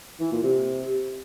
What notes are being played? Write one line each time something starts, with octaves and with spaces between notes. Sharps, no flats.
E3
A#2
C3